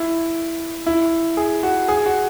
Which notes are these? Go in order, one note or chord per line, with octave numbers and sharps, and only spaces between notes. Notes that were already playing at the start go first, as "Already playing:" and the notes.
Already playing: E4
E4
G#4
F#4
G#4
F#4